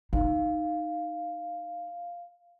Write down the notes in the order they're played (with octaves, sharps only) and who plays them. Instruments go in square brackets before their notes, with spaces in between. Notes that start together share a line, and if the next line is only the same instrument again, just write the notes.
[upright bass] D#4 [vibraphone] F5